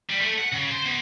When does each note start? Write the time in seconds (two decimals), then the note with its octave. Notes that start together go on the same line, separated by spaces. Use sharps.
0.10 G3
0.22 A3
0.38 F#5
0.52 C#3
0.71 C5
0.85 B2